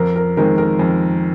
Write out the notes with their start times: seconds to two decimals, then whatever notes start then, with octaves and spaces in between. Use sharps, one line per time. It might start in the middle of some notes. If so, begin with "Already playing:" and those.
Already playing: F2 A#4
0.16 A#4
0.37 D#3 G#3 C4 A#4
0.58 A#4
0.79 F2